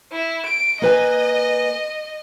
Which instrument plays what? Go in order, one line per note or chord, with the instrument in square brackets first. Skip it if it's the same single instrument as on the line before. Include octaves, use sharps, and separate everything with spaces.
[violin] E4
D7
[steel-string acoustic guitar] A#3 B4 G#5 [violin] D#5